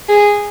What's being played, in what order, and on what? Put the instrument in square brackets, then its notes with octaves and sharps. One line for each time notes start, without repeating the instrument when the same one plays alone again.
[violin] G#4